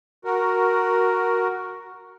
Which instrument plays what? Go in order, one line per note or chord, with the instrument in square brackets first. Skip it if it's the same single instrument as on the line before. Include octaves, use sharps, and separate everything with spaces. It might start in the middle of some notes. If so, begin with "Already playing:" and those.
[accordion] F#4 A#4